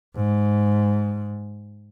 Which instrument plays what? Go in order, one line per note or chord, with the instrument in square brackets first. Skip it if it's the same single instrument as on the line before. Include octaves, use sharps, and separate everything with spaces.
[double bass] G#2